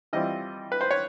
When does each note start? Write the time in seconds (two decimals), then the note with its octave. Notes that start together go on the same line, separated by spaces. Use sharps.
0.13 E3 G3 C4 F4 D#5
0.72 B4
0.81 C5
0.91 C#5